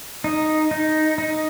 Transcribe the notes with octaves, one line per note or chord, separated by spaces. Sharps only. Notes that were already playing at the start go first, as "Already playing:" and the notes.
D#4
D#4
D#4